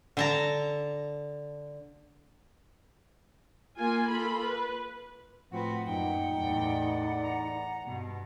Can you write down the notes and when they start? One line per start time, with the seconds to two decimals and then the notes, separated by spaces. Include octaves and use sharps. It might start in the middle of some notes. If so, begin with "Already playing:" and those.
0.17 D3 A5 A#5
3.78 A#3 F4 A#4 G#5
4.10 A#3 F4 A4 B5
4.45 B4
5.51 A2 F3 C4 F#4 B4 F#5
5.87 F#2 A#2 D#4 G5
6.37 E2 A2 D5
7.24 A#5
7.86 G2 B2